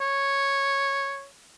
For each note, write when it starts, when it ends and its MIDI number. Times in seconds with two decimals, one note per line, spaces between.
0.01 1.26 73